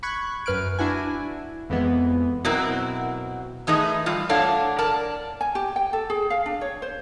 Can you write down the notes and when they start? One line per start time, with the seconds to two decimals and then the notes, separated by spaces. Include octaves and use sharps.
0.03 B5 C#6 F#6 G#6
0.46 F#2 B4 F6 F#6 D7
0.79 D4 E4 F#4 G#5
1.70 F2 E3 G#3 B3
2.45 B2 F#3 C4 E4 F#4 A#4
3.67 E3 A3 D#4 G#4 B4 D#5
4.06 E3 G3 F4
4.29 A2 D4 A4 C#5 F5 F#5
4.78 A#4 D5 A5
5.41 G#5
5.55 G4
5.76 G5
5.93 A4
6.10 G#4
6.30 F5
6.46 D4
6.61 C#5
6.82 C5